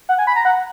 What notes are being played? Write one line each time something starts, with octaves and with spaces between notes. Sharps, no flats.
F#5
G#5
B5
A#5
F#5